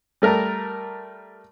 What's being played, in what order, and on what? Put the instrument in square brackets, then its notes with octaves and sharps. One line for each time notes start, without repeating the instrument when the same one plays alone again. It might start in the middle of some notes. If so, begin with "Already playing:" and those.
[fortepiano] G3 A3 A#4